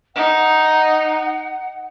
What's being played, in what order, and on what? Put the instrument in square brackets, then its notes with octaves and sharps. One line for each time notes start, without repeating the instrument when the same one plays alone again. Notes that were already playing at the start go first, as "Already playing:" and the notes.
[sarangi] D#4 [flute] F#5